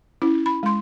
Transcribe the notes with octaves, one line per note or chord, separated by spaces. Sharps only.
C#4 E4
B5
G#3 C6